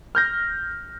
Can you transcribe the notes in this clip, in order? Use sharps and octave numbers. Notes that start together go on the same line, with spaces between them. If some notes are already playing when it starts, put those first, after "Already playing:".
F6 G6 A#6